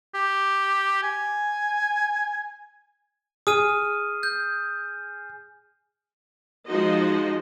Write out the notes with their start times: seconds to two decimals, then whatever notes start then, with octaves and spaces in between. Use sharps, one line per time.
0.14 G4
1.03 G#5
3.47 G#4 D#6 F6 D#7
4.23 G6
6.68 F3 G#3 D#4 F#4 C5 D#5